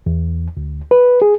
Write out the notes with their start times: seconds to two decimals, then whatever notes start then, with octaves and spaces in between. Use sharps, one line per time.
0.06 E2
0.57 D2
0.91 B4
1.22 G#4